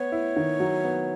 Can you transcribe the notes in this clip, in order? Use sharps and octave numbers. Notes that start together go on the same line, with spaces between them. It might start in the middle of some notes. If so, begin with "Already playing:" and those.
Already playing: B3 C#5
E4
D#3
F#3
B3